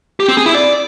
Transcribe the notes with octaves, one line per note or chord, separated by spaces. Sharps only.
G4
C4
G#4
E4
D5